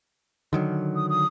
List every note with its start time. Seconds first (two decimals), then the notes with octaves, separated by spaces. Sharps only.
0.53 D3 D#3 F#3
0.96 D#6
1.10 D#6